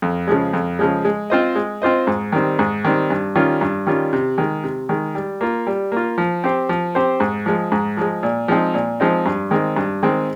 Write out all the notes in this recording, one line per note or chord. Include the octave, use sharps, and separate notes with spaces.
F2
C#3 F3 G#3
F2
C#3 F3 G#3
G#3
C4 F4 C5 D#5
G#3
C4 F4 C5 D#5
G#2
D#3 G3 C4
G#2
D#3 G3 C4
G2
D#3 G3 C#4 F4
G2
D#3 G3 C#4 F4
C3
D#3 G#3
C3
D#3 G#3
G3
A#3 F4
G3
A#3 F4
F3
C4 G4 C5
F3
C4 G4 C5
G#2
F3 G#3
G#2
F3 G#3
A#2
F3 G#3 C4 D#4
A#2
F3 G#3 C4 D#4
G2
D#3 G#3 C4
G2
D#3 G#3 C4